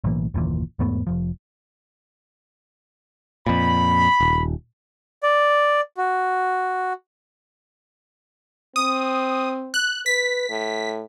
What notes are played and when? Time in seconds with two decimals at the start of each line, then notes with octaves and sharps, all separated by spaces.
0.04 B1 A2 E3 A#3
0.34 F#1 D#2 A#2 E3
0.79 E2 G#2 A3 B3
1.07 F1 F3
3.47 F2 A#2 B5
4.20 D#1
5.23 D5
5.97 F#4
8.76 C4 D#6
9.74 F#6
10.06 B4 B6
10.50 A2